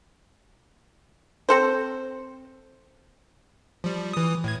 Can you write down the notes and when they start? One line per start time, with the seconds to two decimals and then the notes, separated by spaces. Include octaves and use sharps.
1.49 C4 A4 C5
3.84 F3 G3
4.13 E3 D#6
4.44 A2 G#6